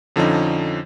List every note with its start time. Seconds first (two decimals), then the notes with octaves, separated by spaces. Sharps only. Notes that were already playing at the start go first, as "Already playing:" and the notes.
0.16 F2 D3 F3 C#4 D#4